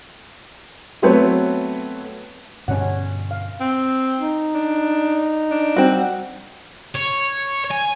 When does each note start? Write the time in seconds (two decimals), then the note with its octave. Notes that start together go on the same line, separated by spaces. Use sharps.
1.02 F#3 A3 B3 C4 B4 C#5
2.68 G2 B2 D3 C#4 C#5 F#5
3.31 F5
3.61 C4
4.18 D#4
4.55 D4
5.51 D4
5.76 G3 C4 F#4
6.95 C#5
7.71 G#5